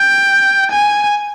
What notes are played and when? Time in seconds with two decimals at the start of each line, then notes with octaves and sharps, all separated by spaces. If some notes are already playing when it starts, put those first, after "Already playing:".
Already playing: G5
0.71 G#5